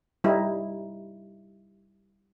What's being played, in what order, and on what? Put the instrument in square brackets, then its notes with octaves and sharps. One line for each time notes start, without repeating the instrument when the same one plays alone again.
[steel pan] G3 D#4 E4